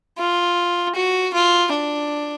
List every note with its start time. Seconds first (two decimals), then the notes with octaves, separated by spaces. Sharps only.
0.18 F4
0.95 F#4
1.34 F4
1.72 D4